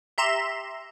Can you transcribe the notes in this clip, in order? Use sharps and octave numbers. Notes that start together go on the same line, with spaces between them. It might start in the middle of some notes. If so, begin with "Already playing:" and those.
G4 E5 A#5 C6 E7